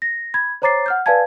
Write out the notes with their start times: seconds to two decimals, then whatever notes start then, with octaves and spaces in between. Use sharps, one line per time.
0.02 A#6
0.34 B5 G#6
0.62 C5 C#5 A#5 D6 A6 C7
0.86 F#5 F6 G6
1.06 B4 D5 F5 G#5 A5 G#6